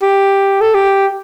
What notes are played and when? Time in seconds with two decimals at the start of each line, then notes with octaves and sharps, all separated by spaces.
0.02 G4
0.61 A4
0.74 G4